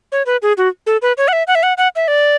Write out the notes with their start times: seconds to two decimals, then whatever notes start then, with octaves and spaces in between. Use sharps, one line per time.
0.12 C#5
0.26 B4
0.42 G#4
0.57 F#4
0.87 A4
1.02 B4
1.17 C#5
1.28 F#5
1.33 E5
1.47 F#5
1.55 E5
1.63 F#5
1.78 F#5
1.96 E5
2.08 D5